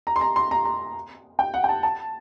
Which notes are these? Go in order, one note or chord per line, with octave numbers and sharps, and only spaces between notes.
A#5
C6
A#5
C6
A#5
A#5
G5
F#5
G5
A5
A5